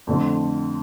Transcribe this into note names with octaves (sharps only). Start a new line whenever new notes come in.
F2 D3 A3 C4 E4